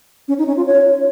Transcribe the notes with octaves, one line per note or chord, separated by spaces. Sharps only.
C#4
D#4
C#4
F4
C#5